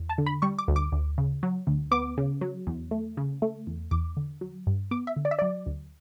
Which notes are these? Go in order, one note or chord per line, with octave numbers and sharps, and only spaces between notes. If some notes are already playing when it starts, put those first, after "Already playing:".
Already playing: E2
A5
D3
B5
G3 C#6
D6
D2
D6
D2
C#3
F#3
D2
B3 D6
C#3
F#3
E2
A3
C#3
A3
E2
E2 D6
D3
F#3
G2
B3 D6
E5
D3
D5
E5
F#3 D5
D2